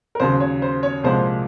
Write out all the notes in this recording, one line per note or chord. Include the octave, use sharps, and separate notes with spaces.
A#4
D#2 C#3 F#3 C5
C#5
C5
C#5
C2 A#2 F3 G#3 C5